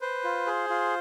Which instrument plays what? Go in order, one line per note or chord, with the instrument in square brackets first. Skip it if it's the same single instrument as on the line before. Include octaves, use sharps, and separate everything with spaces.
[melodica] B4 [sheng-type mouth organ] C5
[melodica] F4
G#4
F4